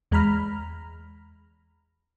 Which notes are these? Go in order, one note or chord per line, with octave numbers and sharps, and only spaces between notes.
E2 G#3 A#5 B5 F6